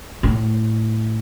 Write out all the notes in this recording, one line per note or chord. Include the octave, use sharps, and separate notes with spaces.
A2